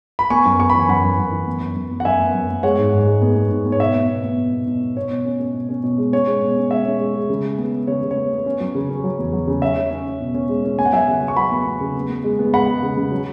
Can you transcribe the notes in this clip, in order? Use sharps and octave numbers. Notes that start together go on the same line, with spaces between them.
B5
B3 G#5 C#6
F#2
B3 C#6
E3 B5
G#5
F#2 F#5 B5
F#2
F#2
E3
B3
F#2
F#2
B3
F#5
F#2 E5 G#5
B3
F#2
B3
G#3 C#5 F#5
G#2
G#2
G#3
B3
B3
G#2
B3
C#5
B2 E5
B3
B2
B3
B2
B2
B2
B2
B2 C#5
B2
C#4
C#4
B2
C#4
B2
G#3
C#4 C#5
G#3
B2
C#4
G#3 E5
C#4
G#3
G#3
C#3
G#3
B3
B3
C#3 C#5
C#3
C#5
B3
B3
C#4
F#3
C#3
C#4
F#3
E2
F#3
C#3
C#4 E5
C#4
C#4
C#4
B2
C#4
G#3
C#4
B3 G#5
F#5
F#3 E5 G#5
C#3
F#3
C#6
F#3 F#5 B5
B3
B3
C#3
B3
B3
G#3
B3
G#3 F#5 B5
G#3
C#3
C#3
F#3